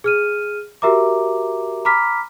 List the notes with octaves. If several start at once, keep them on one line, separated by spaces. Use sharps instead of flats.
G#4 F6 D#7
F#4 G4 A#4 E5 A#5 D6
A#5 B5 D6 F6 B6